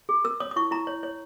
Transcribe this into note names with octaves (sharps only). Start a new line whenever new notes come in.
G#4
A#4 E6
C#5 D#6
D#6
E4 C#6
E4 A#5
C#5
C#5